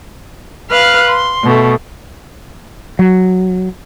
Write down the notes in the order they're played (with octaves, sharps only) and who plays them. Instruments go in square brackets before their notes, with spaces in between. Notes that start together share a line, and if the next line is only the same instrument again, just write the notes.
[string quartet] B4 F5 F6 F#6
C6
B2 A3
[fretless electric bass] F#3